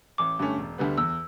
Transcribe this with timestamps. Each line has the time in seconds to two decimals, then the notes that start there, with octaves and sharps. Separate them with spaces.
0.18 A1 D6
0.39 G2 D3 A3 C#4
0.58 E1
0.78 D2 D3 G3 B3
0.98 E2 E6